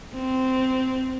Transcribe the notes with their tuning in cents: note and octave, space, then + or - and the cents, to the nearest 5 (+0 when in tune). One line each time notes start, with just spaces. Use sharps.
C4 -10